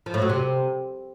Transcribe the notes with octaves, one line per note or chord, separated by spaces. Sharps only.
F3
A2
F#3
C3